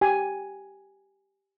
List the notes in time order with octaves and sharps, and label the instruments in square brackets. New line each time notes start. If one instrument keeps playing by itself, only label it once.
[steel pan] G4 G#5